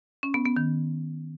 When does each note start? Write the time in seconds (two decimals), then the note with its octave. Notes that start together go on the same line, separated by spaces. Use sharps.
0.23 C#4
0.34 B3
0.45 B3
0.56 D#3